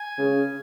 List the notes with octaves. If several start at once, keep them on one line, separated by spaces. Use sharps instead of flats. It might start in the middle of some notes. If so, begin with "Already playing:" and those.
Already playing: G#5
C#3